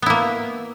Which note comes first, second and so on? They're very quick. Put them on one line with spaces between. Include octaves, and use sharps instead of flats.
B3 E4 A#3